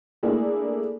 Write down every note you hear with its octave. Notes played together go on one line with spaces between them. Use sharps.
A3 A#3 D4 E4 G#4 A4